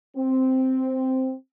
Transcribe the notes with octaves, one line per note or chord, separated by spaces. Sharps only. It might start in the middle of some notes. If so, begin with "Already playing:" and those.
C4